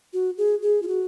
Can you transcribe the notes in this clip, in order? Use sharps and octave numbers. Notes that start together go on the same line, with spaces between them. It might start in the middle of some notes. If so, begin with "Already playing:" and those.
F#4
G#4
G#4
F4
F#4